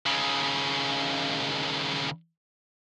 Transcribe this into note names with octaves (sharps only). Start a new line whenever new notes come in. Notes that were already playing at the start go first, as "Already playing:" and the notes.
D#2 C#3